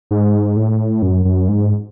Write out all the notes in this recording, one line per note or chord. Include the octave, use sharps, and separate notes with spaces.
G#2
A2
F#2
F#2
G#2